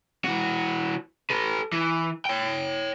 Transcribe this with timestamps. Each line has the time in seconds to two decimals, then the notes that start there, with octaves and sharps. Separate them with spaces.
0.24 E3 F#4
1.30 A4 B4
1.73 E3
2.25 C#5 G5